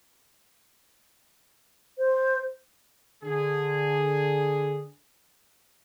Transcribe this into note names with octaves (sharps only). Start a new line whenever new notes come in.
C5
D3 G#4